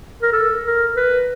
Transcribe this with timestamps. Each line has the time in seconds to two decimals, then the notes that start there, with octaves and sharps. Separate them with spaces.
0.22 A#4
0.32 A4
0.65 A#4
0.96 B4